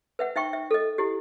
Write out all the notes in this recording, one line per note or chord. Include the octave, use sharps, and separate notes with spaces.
B4 E5 F#5
D#4 E5 G5 C#6
E5
A4 D#5
E4 G4